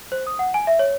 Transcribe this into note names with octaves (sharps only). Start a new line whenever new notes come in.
C5
D#6
F#5
G#5
E5
C#5